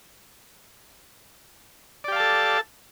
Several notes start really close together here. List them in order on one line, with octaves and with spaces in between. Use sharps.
D5 G4 F5 A5 A4